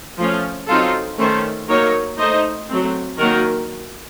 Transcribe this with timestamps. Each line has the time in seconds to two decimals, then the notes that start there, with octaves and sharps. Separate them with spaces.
0.18 F3 A3 C#4 F4
0.68 F#3 C4 D#4 F4 A4
1.18 D#3 A3 C#4 A4 C5
1.68 F#3 A#3 D#4 A#4 C#5
2.18 A3 D#4 C5 D#5
2.68 F#3 A3 C4
3.18 D#3 F#3 A#3 D#4 F#4 A#4